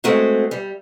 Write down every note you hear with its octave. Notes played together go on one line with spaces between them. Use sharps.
G#3 A3 C4 F#4 G#4
G3